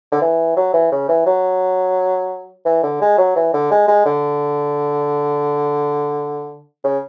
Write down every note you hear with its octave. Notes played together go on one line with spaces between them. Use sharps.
D3
E3
F#3
E3
C#3
E3
F#3
E3
D3
G#3
F#3
E3
D3
G#3
G#3
D3
C#3